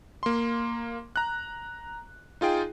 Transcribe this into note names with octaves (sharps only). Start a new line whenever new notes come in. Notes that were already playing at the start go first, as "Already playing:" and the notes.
A#3 C6
A#5 F#6
D#4 F4 G#4 G5